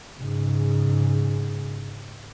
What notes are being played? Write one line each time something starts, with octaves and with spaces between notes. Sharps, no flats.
G#2 C#3